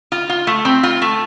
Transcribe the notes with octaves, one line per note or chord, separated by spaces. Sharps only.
F4
F4
A3
C4
F4
A3